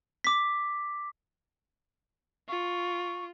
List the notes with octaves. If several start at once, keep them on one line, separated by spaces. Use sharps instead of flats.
D6 B6
F4 C#6